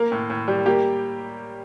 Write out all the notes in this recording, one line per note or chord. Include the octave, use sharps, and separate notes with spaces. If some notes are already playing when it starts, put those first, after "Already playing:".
Already playing: A#3 A#4
A2
A2
G3
A#3 G4